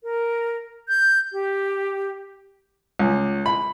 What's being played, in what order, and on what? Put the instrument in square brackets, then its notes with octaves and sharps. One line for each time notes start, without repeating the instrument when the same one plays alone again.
[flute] A#4
G6
G4
[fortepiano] C#2
B5